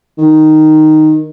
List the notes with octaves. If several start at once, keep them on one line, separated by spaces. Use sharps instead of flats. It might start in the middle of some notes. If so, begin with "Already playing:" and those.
D#3